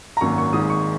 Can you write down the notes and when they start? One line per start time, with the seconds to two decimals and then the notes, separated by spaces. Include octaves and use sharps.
0.17 A#5
0.21 G#1 F#2 F#3 A#3 C#6
0.38 C#6
0.53 G#1 G#2 G#3 D#6
0.70 C#6